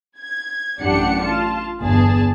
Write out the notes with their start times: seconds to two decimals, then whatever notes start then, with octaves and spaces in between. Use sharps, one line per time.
0.20 G#6
0.81 A1 F#2 D4 G4 F#5 C#7
1.23 F4 A5
1.81 G1 E2 G#4 A5